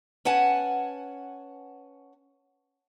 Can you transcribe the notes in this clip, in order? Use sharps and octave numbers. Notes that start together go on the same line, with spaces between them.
C#4 B4 F#5 G#5 A5